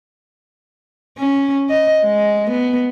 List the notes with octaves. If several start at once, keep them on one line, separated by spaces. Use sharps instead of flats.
C#4
D#5
G#3
B3